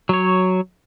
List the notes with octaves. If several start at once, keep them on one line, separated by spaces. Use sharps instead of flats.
F#3 C#5